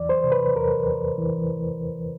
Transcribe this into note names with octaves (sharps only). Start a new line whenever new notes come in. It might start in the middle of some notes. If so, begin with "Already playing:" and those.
Already playing: E2 E3 D5
C5
C3
B4
E2 A#4
E2
E3